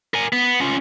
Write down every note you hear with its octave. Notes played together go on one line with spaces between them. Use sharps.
A#4 G#5
B3
C#4 F4